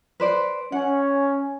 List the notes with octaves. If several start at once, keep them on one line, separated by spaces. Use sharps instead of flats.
B4 C5 D5
C#4 F#5